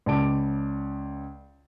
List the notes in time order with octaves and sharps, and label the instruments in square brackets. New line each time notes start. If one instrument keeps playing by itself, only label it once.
[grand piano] C#2 C#3 D5 A5 D6 D7